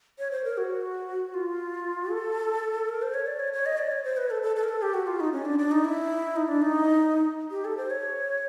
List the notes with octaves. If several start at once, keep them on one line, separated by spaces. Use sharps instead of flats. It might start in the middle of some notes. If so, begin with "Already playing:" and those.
C#5
C5
A#4
F#4
F4
A4
A#4
C5
C#5
D5
C#5
C#5
D#5
D5
C#5
C5
B4
A4
A4
A4
A#4
A4
G4
F#4
F4
D#4
C#4
D4
D4
D#4
E4
D#4
D4
D#4
G4
A4
C5
C#5